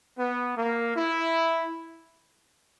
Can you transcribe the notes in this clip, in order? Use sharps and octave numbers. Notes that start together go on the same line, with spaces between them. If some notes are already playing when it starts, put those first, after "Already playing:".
B3
A#3
E4